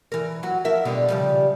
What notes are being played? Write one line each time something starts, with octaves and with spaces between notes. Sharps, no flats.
E3 A#4
F#3 F#4
F3 A#4 E5
B2 D3 G3
C#3 F3 G3